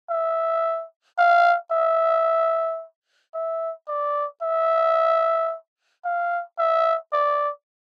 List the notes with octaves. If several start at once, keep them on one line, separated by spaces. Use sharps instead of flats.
E5
F5
E5
E5
D5
E5
F5
E5
D5